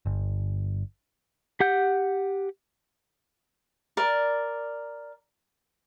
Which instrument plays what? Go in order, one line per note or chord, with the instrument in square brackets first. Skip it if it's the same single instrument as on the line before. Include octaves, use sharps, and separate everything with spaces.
[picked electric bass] G1
[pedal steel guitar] G4 F#5 G6
[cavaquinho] A#4 D5